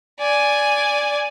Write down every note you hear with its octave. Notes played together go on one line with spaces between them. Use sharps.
D5 G#5